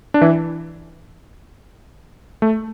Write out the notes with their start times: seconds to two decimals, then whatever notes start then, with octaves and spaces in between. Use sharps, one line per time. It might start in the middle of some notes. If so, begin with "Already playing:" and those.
0.14 D4
0.21 E3 E4
2.42 A3